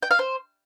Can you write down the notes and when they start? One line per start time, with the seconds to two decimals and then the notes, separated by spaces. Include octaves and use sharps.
0.03 G5
0.11 F5
0.19 C5